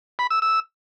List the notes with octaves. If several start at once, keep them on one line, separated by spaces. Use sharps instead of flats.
B5
E6
E6